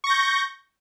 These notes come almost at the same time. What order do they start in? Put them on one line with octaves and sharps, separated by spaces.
C#6 A#6 G6